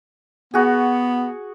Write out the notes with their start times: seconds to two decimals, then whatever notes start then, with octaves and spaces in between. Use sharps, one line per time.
0.54 B3 F#4 G#4